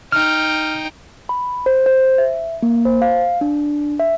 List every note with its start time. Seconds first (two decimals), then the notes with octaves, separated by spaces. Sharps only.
0.12 D#4 G5 F6
1.29 B5
1.66 C5
1.86 C5
2.18 E5
2.62 A#3
2.85 C5
3.02 F5
3.41 D4
4.00 E5